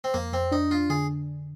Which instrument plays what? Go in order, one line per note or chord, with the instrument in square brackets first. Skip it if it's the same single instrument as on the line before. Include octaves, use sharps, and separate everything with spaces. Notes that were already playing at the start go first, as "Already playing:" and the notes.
[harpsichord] C4
[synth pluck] F2 [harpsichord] A#3
[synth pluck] F2 [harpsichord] C4
[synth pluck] D4 [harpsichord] D#4
[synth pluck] D4 [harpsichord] F4
[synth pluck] D3 [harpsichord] G#4